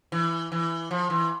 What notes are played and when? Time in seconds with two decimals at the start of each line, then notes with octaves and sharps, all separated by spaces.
0.12 E3
0.52 E3
0.91 F3
1.10 E3